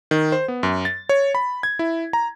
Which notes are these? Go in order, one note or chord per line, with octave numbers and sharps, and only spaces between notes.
D#3
C5
B3
F#2
A6
C#5
B5
G#6
E4
A#5